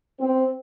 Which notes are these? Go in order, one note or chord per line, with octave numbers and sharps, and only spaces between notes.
C4